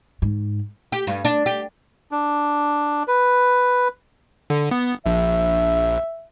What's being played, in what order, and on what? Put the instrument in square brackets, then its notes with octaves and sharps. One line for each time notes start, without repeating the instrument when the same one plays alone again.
[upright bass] G#2
[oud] G4
G2
D4
G4
[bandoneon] D4
B4
[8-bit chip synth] D3
B3
[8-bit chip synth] A#1 [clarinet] E5